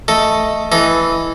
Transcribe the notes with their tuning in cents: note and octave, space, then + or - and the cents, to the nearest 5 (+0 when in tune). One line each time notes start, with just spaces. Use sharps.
A3 +0 A4 +0 D#5 +0
E3 +0 A4 -20 D#5 +5